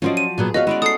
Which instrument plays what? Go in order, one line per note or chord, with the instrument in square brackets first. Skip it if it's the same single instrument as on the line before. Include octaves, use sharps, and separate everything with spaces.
[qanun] F3 F#3 D5 [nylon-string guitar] C#4 C5 D#5
[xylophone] D#7
[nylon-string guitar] A#2 F#3 B3 [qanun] G#4
[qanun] B3 F#4 [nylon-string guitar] B4 C#5 F5 [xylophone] D#5
[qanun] G#3 C#4 D5 [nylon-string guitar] E4
[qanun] A4 [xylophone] D#6 C7